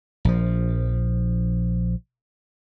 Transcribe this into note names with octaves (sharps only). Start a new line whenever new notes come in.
A#1 F3